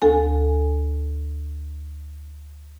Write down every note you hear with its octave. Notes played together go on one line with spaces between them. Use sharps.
D2 A4 G#5